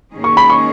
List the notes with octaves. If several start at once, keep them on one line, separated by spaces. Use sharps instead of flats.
G#2 D#3 A#3 C#4 G#4
C#6
B5
C#6